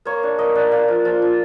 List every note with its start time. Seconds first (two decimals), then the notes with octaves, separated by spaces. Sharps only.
0.05 A#3 C#5
0.23 D4
0.38 A#3 D#5
0.55 D4
0.71 D4 F5
0.88 F3
1.05 F3
1.22 F3